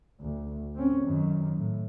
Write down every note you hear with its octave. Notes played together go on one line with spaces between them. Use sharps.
D2
C4 C#4
F#2 D#3
A2